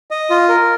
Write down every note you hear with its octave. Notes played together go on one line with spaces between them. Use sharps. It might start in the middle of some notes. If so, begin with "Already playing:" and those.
D#5
F4
A#4